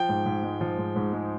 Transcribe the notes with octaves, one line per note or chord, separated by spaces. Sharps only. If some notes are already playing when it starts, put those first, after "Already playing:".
Already playing: F3 G5
G#2
G#2
G#3
F3
G#2
G#2
G#3